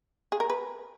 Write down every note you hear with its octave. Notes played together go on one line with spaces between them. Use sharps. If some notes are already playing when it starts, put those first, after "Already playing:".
G#4
A#4
B4